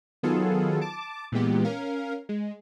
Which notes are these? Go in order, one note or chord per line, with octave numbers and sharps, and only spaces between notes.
D#3 F#3 B3 F4 G#4 A4
A5 D6
A#2 E3 G#3 B3 G4
C#4 A#4 F5
G#3